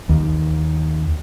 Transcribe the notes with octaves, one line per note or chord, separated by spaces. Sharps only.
D#2